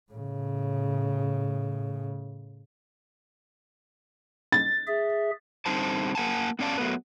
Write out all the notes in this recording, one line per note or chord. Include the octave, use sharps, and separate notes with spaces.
A2 C#3
A6
G#4 E5
D3 G3 C4 D#4 C5 A5
A#3 F#5 G#5 A5
B3 C#4 D5 F5 A5
F#3 A3 B3 B4